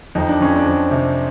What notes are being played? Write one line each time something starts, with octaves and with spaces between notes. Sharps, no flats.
F2 D#4
D4
F2 C#4
C4 D4
F2
C3